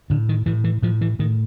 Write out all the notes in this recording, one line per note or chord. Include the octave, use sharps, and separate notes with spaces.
A2 D3
D#3
A2 E3
E3
A2 F3
E3
A2 D#3